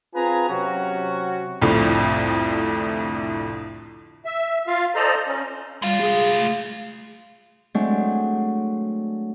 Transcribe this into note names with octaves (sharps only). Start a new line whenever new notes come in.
C4 F4 G#4 B4 G#5 A#5
C3 F#3 C#4 F#4
C2 F2 A2 D3
E5
F4 F5
A4 C5 D5 D#5 A#5
C#4
G3 G#3 F5
G#4
A3
F#3 G#3 A3 C4 D4